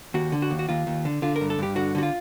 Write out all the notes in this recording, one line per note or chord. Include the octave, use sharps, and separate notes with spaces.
D#2 F#4
D3
F#4
D#2
F#4
D#2 F4
D#2
D3
D3 F4
A#4
G2
A4
G2 G4
D3 F#4
D3 F#4
F4